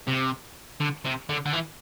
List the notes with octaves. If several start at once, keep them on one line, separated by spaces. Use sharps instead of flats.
C3
D3
C3
D3
D3
E3